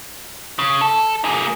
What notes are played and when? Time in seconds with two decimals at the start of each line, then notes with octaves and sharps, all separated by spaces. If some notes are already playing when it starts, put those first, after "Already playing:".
0.59 C#3
0.81 A4
1.25 A#3 G#4